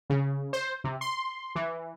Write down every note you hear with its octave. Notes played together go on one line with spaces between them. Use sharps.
C#3
C5
C3
C6
E3